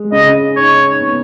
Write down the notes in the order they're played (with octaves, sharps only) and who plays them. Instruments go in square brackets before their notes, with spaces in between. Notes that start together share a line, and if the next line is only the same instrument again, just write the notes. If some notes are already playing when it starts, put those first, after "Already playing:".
Already playing: [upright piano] G#3
[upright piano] C#3 [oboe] D#5
[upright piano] D#4 [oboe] C#5
[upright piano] B3